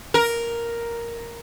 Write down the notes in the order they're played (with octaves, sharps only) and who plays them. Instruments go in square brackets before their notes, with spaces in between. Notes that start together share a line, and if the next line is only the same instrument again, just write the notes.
[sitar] A#4